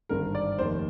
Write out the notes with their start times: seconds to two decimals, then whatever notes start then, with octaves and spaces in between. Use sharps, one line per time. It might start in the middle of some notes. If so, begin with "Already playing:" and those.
0.09 G#1 G2 D3 A#4
0.35 D5
0.59 F1 D#2 D#3 C5